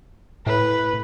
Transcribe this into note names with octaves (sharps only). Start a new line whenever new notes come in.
A2 B4